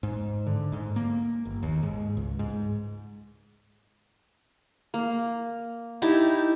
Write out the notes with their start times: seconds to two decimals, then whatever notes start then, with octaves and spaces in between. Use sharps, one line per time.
0.03 G#2
0.46 D3
0.72 G#2
0.96 A#3
1.45 G1
1.63 D#2
1.83 G#2
2.17 C#2
2.39 G#2
4.94 A#3
6.02 D#4 E4 G4 A5